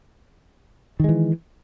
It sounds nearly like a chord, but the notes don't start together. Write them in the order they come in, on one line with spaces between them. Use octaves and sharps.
D#3 G#3 E3